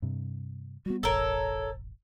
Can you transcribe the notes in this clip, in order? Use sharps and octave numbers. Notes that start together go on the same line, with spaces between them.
G2 C3
G3 B3 F#4
E1 A1 A4 A#4 C#5